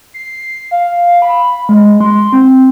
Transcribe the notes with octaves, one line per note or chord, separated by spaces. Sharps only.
C7
F5
B5
G#3
C6
C4